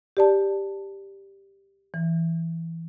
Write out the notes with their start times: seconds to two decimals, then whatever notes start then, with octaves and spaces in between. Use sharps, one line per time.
0.17 G4 D5 A5
1.94 E3